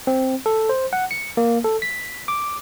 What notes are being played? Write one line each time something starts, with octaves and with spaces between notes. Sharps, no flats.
C4
A4
C5
F#5
C#7
A#3
A4
B6
D6